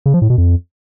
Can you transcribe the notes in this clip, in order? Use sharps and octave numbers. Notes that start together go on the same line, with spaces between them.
C#3
F3
A2
B2
F2